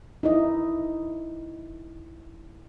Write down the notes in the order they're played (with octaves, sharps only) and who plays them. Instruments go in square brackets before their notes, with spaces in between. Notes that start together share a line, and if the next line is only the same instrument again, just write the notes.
[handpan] D#4 E4 D#5